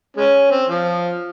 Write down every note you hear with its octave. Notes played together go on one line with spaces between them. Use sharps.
G#3 C#4
C4
F3